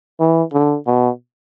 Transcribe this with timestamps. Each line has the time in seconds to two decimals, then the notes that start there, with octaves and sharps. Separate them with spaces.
0.19 E3
0.53 D3
0.86 B2